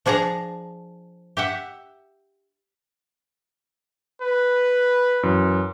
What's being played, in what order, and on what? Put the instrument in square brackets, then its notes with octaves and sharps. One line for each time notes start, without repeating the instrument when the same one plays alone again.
[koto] F3 D4 G#4 A5 A#5
G4 E5 F#5
[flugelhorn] B4
[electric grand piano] F#2 E3